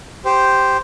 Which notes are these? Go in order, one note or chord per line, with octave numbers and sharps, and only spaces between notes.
G4 C5